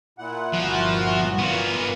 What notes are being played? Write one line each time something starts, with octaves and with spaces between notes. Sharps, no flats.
A#2 E4 F#5
G1 F3 F#4
A#2 E3 A#3 B3 F4